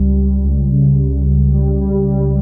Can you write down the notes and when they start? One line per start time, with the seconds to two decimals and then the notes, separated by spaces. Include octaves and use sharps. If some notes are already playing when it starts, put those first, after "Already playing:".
Already playing: C#2 G3
0.17 G3
0.44 C#2
0.72 C#3
0.98 C#2
1.26 C#2
1.54 G3
1.81 G3
2.08 G3